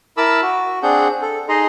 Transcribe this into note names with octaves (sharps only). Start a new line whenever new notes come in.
E4 A#4 A5 B5 D6 E6
F#4
C4 D4 G#4 F#5 G6
A4
D#4 G#4 D#5 A#5 C6